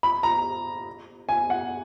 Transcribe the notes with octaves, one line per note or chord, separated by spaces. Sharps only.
B5
A#5
G#5
F#5